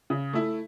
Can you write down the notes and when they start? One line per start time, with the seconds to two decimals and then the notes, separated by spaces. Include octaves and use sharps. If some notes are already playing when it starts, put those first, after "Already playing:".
0.10 C#3
0.33 A3 E4